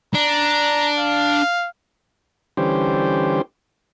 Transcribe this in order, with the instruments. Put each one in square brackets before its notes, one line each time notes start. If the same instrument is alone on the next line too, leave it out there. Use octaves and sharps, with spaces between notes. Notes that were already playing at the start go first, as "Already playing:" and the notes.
[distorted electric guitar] D4 [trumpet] A#5
[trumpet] F5
[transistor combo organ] D3 E3 G3 C#4 G4 C5